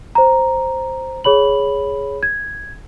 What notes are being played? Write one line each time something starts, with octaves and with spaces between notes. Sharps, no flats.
C5 A#5
G#4 C#5 B5 F#7
G#6